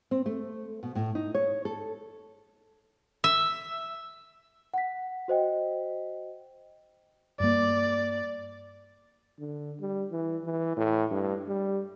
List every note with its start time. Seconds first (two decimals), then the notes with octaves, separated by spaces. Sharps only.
0.11 C4
0.26 A3
0.83 B2
0.95 A2
1.15 D#4
1.35 C#5
1.65 A4
3.24 E5
4.74 F#5 B6
5.28 F#4 C5 D#5 G5
7.40 G2 A#3 D5
9.39 D3
9.80 G3
10.11 E3
10.44 E3
10.77 A2
11.11 G2
11.48 G3